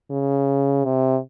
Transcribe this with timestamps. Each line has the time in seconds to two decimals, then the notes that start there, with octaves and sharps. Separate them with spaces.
0.10 C#3
0.85 C3